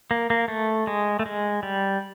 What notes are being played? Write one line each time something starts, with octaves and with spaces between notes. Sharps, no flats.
A#3
A#3
A3
G#3
A3
G#3
G3